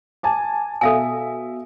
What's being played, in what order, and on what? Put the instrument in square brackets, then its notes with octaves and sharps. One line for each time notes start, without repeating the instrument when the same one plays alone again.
[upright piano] G#5 A5 D6
[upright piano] B2 E5 [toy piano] A4 F5 G#5